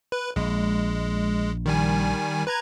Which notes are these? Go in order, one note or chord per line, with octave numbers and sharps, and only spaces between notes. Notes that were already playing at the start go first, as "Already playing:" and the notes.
B4
A#1 G#3
D#3 G3 G#5
B4 A#5 G#6